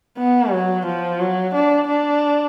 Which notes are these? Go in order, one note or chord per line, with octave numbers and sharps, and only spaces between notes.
B3
F#3
F3
F#3
D4
D4